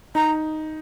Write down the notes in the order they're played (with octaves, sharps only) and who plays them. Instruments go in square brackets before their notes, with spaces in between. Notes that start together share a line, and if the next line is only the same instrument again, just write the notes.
[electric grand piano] D#4 [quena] A#5